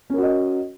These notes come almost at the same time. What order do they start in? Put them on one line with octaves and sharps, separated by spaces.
C#4 A#4 F#4 D#5